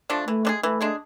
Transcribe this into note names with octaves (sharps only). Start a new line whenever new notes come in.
F3 A3 D4
E3 A3
G#3 D4 G#4
E3 A3
G#3 D4 G#4